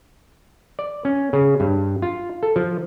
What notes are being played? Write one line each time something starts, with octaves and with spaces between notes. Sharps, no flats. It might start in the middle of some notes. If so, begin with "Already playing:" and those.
D5
C#4
C#3
G2
F4
A4
F3